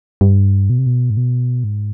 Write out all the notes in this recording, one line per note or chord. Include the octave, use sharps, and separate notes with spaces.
G2
B2
C3
B2
G#2
B2
G#2